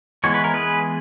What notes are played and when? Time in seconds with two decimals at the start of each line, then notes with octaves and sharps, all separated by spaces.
0.24 E3 G#3 B3 C#5
0.34 B4
0.44 A#4
0.54 G#4 B4